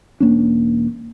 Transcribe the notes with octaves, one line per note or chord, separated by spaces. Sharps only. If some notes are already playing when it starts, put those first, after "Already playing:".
E1 A#3 C#4 D4